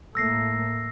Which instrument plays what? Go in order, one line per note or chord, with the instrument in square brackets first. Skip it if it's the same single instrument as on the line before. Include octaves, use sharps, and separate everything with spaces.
[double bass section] A2 A3 A#3 [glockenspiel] E6 A#6 C7